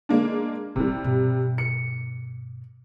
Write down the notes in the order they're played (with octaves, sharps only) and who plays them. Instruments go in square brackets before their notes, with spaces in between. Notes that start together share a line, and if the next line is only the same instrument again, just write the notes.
[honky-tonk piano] G#3 A#3 D4
[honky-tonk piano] C3 G3 [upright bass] E3 B3
[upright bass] G2 B2
[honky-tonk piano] C#7